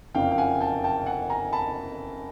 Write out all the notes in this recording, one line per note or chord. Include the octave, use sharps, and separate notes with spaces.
F#1 F2 C#3 F3 F5 G5
G5
F#5 G#5
G5 A5
G5 A5
F#5 G#5
G#5 A#5
A5 B5